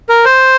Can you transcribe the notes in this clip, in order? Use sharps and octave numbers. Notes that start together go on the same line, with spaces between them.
A#4
C5